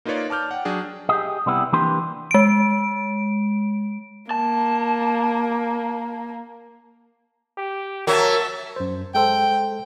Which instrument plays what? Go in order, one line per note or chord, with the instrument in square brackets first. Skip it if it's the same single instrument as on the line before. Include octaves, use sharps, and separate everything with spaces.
[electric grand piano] A#3 D#4 F4 B4 C#5 D5
A5 D6 F6 G6
F#5 G5
F#3 D4 G#4
[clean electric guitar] G4 G#4 D#5
C3 G3 B3 E4
E3 A#3 D4 G4 B4 C6
[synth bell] G#3 D7
[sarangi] A#3 [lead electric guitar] A5
[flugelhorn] G4
[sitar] F#3 [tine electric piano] A#4 [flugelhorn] C#5 [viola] E5 A5
[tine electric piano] F#2 C5
[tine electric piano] G#3 A4 C5 [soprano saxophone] G5